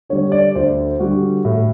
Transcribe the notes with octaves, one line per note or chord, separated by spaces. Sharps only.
D3 G3 C#5
D5
D2 C5
D3 G3 F#4
A2